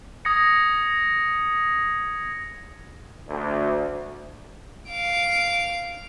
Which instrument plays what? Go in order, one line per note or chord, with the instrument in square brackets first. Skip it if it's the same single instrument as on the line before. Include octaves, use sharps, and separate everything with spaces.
[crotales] D#6 G#6 A#6 C#7
[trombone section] D2
[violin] F5 D7